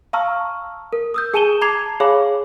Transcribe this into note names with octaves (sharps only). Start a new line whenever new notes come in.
F5 A5 A#5 C#6 E6 F6
A#4
D#6 E6 G6
G#4 G#5 A5 D#7 E7 G7
A5 A#5 D6 G#6 C7 F7
G#4 C#5 F5 G#5 B5 D6